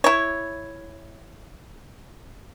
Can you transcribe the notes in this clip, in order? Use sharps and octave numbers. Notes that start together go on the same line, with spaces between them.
E4 C#5